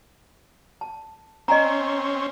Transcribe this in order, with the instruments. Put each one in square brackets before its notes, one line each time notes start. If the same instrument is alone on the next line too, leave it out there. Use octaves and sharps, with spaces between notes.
[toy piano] A5
[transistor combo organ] C4 C#4 [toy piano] D#5 G#5 A#5